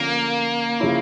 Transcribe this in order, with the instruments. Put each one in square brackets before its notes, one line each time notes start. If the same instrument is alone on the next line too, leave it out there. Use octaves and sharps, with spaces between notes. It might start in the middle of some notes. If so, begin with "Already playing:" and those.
Already playing: [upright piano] D3 F3 C#4 [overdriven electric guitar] A#3
[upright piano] C#3 F3 C#4 E4